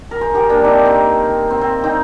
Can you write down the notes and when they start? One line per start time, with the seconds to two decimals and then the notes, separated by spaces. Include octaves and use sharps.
0.11 A#4
0.21 G#4 C5
0.34 G4 A#4
0.49 A#3 D4
0.65 C4 D#4
0.86 C4
1.50 C4
1.61 C4
1.84 C4 D#4